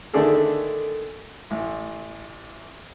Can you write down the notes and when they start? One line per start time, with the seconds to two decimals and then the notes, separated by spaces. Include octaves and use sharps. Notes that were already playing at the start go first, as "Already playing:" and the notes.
0.13 D3 D#3 A3 D4 G#4 A4
1.51 A1